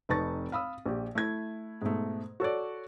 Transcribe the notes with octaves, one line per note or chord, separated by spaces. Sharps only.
F1 D#4 B4 A5 C#6 A6
F5 B5 D#6 E6
A#1 G4
A3 E4 G#6
G#2 B2 A3
F#4 A4 C#5 D5